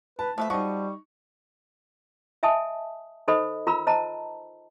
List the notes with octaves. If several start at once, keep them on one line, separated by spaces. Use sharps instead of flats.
B4 A5
F3 A3 B4 E5
F3 G3 D#4 F#4 D#5 C#6
D#5 E5 G#5 A5 D#6
D#4 A4 C5 D#5 B5
F4 A#4 A#5 B5 E6
C5 D#5 A5 A#5